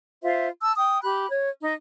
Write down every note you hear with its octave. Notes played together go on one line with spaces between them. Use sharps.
F4 C5 E5
A5 E6
G5 D#6
G4 B5 F#6
C#5
D#4